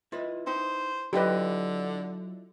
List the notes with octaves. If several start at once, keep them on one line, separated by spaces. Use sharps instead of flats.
E4 F4 B4 D#5
D#4 C5
D3 F#3 E4 F4 G4 B4 D#5